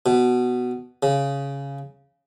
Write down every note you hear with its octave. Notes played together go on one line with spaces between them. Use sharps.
B2
C#3